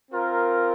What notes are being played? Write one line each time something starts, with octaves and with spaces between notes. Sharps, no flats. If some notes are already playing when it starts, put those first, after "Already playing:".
C4 F4 A#4